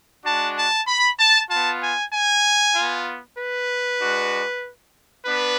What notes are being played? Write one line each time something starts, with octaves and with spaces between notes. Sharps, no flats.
G#3 D4 F#4 A5
A5
B5
A5
B3 F4 A5
G#5
G#5
B3 F4
B4
G#3 D4 F#4
B3 D4 B4